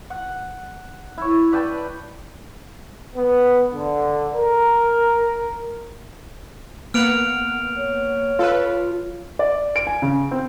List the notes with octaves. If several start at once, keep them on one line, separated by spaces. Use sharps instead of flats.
F#5
E4 C#5
B4 D5 G5 A5
B3
D3
A#4
A#3 B3 F#5 F6 D7 F7
C#5
F4 A4 B4
D5
D7
G#5
C#3
C4